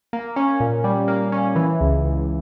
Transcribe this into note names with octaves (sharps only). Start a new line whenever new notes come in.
A#3
C#4
A#2
G3
A#3
C#4
E3
C#2
C#2